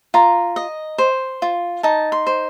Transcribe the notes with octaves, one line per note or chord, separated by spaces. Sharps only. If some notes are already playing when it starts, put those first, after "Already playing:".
F4 A#5
D#5
C5
F4
D#4 A5
C6
C5